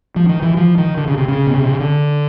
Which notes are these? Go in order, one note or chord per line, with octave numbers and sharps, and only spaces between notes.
F3
D#3
E3
F3
D#3
D3
C#3
C3
C#3
B2
C3
C#3
D3